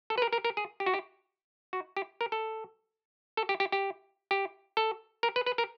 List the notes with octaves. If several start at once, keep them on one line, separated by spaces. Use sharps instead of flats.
A4
B4
A#4
A#4
A#4
G#4
G4
F#4
G4
F#4
G4
A#4
A4
A4
G4
G4
G4
G4
A4
A#4
B4
B4
A#4